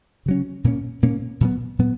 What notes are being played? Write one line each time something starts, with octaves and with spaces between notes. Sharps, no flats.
C#3 F#3 C#4
A#2 A#3 C#4
A#2 A#3 C#4
A#2 F#3 B3
A#2 F#3 B3